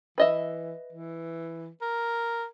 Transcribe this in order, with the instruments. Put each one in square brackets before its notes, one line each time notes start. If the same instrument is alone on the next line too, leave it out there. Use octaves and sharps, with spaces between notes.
[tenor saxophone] E3 [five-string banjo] B4 D#5 E5
[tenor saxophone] E3
A#4